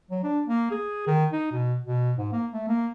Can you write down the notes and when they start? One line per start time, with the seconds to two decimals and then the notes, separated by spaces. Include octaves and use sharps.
0.11 F#3
0.23 D4
0.48 A#3
0.71 G#4
1.07 D#3
1.32 D#4
1.51 B2
1.87 B2
2.18 G#2
2.32 A#3
2.52 A3
2.68 A#3